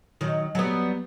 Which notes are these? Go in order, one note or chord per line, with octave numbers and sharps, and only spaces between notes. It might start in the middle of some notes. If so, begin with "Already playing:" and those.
D#3 F#3
F#3 G3 B3